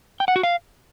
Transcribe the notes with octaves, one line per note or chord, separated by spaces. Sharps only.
G5
F#5
F#4
F5